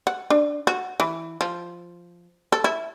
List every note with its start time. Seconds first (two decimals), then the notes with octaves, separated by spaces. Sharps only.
0.07 F#5
0.30 D4
0.67 F#4
1.00 E3
1.41 F3
2.52 A4
2.64 E4